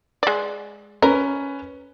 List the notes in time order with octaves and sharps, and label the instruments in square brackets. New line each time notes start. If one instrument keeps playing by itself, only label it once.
[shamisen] G#3 D5
[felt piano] C#4 B4 [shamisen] A#4